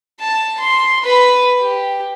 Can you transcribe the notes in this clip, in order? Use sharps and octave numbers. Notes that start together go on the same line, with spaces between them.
A5
C6
B4 B5
G4